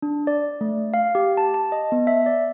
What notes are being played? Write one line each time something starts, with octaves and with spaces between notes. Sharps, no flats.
D4
D5
A3
F5
G4
A5
A5
D#5
B3
E5
D5